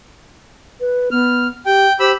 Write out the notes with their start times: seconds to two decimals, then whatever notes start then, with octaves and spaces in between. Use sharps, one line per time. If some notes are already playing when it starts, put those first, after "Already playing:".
0.80 B4
1.11 B3 F6
1.66 G4 G5
2.00 G4 C5 B5 E6